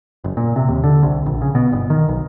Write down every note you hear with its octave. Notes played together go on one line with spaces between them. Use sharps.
F#1
A#2
C3
D#2
D3
C2
A#1
C#3
B2
G1
D#3
B1